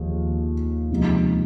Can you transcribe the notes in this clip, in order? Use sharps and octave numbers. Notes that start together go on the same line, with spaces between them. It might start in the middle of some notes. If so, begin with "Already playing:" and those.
Already playing: D#2 F3 G#3
C#2 C3 F3 A#3 D#4